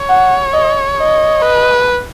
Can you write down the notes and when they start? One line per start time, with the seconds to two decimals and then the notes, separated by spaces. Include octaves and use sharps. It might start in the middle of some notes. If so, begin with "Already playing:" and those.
Already playing: C#5
0.09 F#5
0.54 D#5
0.98 D#5
1.42 B4